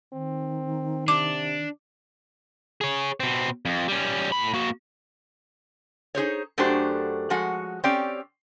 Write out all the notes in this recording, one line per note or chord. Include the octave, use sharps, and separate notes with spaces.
D#3 C4
C3 D4 D6
G#4 C#5
B2 C4
F2
G3 C#4
A2 B5
A#3 F#4
D#4 G#4 C5 C#5
F#2 A3 D4 F#4 G4 C5
F3 G#3 F#4 F#5
C4 C#4 G4 D5 G5